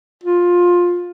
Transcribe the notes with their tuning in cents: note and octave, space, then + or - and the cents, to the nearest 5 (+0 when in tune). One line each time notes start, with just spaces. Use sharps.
F4 +15